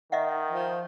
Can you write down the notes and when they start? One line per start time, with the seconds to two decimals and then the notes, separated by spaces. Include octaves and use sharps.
0.12 D#3 D#5 E5 F#5
0.51 F3